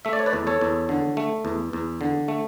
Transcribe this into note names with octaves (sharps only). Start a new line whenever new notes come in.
A3 E5
D5
C#5
B4 D5
E2
A4 C#5
E2
D3
A3
E2
E2
D3
A3